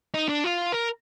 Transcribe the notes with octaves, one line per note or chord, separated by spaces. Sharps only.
D#4
D4
F4
A#4